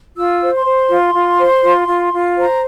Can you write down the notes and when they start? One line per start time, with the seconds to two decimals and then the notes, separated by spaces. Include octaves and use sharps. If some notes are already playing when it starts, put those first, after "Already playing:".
0.16 F4 E6
0.40 C5
0.53 C6
0.66 C5
0.89 F4
1.14 F4
1.39 C5
1.63 F4
1.88 F4
2.12 F4
2.37 C5 A#5